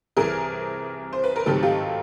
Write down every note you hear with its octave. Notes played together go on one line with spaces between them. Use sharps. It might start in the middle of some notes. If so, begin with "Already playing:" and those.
C2 C3 E3 G#4 A#4
C5
B4
A#4
G#2 D#3 F#3 A3 C4 G4 A4
F4 G4